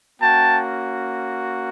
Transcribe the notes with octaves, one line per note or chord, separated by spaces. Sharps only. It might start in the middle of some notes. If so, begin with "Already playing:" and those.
A#3 C#4 F#4 G5 A5